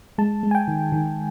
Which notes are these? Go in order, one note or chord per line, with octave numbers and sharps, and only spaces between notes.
G#3 A5
G#3
G#5
G5
D#3
D#3